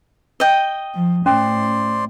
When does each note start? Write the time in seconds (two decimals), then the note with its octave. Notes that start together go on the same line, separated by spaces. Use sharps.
0.40 D#5 G5
0.94 F3
1.26 A2 C#4 C5 D5 C6